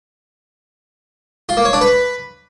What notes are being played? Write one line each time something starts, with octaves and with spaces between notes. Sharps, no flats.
F4
A#3
C#5
D4
B4